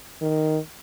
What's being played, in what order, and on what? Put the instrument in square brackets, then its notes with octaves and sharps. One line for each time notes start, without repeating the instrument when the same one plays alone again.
[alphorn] D#3